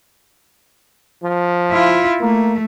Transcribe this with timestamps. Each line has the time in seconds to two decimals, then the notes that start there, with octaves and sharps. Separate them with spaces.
1.23 F3
1.72 E4 F4
2.21 A3 A#3